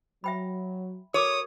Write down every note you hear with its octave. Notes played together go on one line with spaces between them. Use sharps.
F#3 E5 G5 B5
F#4 A#4 C#5 D6 D#6